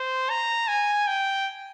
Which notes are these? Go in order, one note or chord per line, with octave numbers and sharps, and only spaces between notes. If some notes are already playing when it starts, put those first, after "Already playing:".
Already playing: C5
A#5
G#5
G5